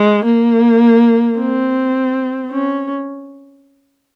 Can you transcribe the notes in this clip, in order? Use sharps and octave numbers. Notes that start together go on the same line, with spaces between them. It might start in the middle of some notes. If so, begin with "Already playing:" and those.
Already playing: G#3
A#3
C4
C#4